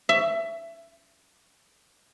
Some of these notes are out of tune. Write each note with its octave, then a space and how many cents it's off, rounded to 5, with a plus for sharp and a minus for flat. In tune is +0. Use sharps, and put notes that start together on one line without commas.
E5 +20